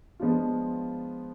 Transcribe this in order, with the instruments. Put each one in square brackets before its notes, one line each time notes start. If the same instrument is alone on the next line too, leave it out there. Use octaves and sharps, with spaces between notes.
[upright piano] F3 G#3 B3 D4 F4